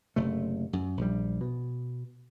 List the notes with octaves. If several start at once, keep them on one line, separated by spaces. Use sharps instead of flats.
F#1 C3 A3
F#2
A#1 G3
B2